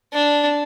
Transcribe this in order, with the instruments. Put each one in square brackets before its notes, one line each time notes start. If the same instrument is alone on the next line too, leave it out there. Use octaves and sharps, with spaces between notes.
[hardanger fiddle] D4